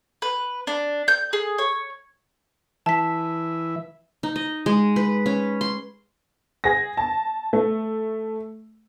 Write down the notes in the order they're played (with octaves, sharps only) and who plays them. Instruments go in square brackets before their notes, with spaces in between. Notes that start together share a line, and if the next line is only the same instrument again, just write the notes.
[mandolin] B4
D4
G6
G#4
C#5
[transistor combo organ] E3 E5 [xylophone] A5 B6
[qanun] D#4
D#5
G#3
B4
C#4
C6
[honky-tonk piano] G#4 A#6
A5
A3